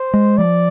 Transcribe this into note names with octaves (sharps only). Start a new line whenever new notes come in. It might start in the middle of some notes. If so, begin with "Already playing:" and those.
Already playing: C5
G#3
F3 D5